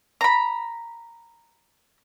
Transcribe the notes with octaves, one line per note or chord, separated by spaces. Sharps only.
A#5 B5